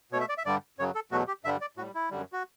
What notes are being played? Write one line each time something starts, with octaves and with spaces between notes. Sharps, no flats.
B2 A3 C#5 E5
D5
E5
G2 D3 G3 D5
F#2 C#3 F#3 C#5
A4
E2 B2 F#3 A3 F#4
G4
G2 D3 G3 E5
D5
A2 G3 F#4
E4
F#2 D3 G3
F#4